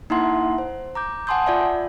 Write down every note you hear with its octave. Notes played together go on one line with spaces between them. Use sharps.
A#3 D#4 E4 E5 F#5 C6
C5
A#5 D6 G6
F#5 G#5 A5 C6 D#6 G6
F4 D5 E5
F4